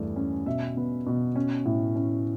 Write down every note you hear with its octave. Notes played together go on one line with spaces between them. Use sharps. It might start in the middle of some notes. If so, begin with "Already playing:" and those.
Already playing: E2 G2 A3
C#4
B2 E5
B3
B2
C#4
A2
C#4